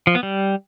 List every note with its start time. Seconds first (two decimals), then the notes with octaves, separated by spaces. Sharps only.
0.07 F3
0.15 B3
0.23 G3